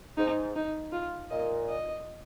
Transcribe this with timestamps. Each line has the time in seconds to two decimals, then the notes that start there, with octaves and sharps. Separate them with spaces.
0.17 G#2 D#4
0.56 D#4
0.92 F4
1.30 A#2 D#5
1.68 D#5